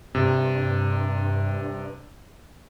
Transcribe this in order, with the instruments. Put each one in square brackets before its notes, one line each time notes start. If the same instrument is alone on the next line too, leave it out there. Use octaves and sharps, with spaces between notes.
[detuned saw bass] G2 [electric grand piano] C3